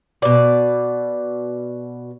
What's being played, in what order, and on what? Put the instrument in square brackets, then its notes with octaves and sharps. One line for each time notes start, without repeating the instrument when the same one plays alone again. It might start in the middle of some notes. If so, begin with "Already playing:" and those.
[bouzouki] B2 D5